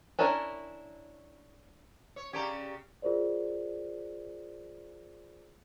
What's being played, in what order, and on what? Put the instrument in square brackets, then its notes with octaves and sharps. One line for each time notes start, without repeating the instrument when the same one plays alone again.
[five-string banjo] C#4 D4 E4 A#4 C#5
[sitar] C#5
[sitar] C#3 G4 [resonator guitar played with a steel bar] C#4 D5 A#5
[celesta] F4 G#4 A#4 C5 D5